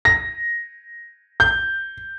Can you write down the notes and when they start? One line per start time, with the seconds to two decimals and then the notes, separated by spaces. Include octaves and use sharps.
0.05 A#6
1.40 G6